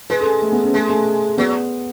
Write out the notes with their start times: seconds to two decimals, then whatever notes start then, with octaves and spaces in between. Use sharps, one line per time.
0.10 G#3 B4
0.21 A4
0.42 A3
0.52 B3
0.63 C#4
0.73 G#3 A3
0.89 A3
1.37 F#3 B3